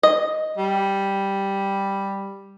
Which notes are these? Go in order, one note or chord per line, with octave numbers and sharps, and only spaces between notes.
D#5
G3